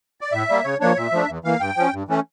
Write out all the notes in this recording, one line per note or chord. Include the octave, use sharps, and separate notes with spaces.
D5
A2 E5
G3 A#3
C#3 C#5
F3 A#3 D4 C#5
A#2 E5
F3 A3 D4
E2
E3 A#3 F5
G2 G5
F3 C#4
G2
E3 A3 C#4